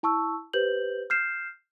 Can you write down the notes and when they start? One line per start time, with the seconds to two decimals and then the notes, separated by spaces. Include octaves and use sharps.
0.03 E4 A5 C#6 E6
0.53 G4 B4 C5 G6 F#7
1.10 F6 G6 C7 E7